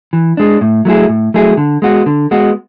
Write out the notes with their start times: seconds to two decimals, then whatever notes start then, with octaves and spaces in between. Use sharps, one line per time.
0.13 E3
0.37 G#3 D4
0.61 A2
0.85 F#3 A3 E4 G#4
1.09 A2
1.34 F#3 A3 E4 G#4
1.57 D3
1.82 G#3 B3 F#4
2.06 D3
2.31 G#3 B3 F#4